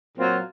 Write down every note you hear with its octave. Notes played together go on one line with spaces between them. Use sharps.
A#2 F#3 C4 F4